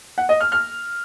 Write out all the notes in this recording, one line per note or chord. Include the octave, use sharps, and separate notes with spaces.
F#5
D#5
F6
F6